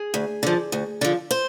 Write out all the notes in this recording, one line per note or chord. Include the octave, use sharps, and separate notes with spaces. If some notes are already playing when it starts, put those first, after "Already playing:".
Already playing: G#4
D2
D3 F3
D2
D3 F3
C5